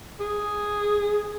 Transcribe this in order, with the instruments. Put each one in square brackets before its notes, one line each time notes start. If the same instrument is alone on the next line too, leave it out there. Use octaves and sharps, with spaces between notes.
[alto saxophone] G#4